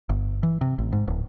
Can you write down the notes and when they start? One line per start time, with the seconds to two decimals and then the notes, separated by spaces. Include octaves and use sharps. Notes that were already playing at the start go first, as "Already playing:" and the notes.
0.09 G1
0.43 E3
0.61 C3
0.79 A1
0.93 G#2
1.08 D1